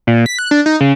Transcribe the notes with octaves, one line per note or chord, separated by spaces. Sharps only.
A#2
B6
F#6
D4
D#4
C#3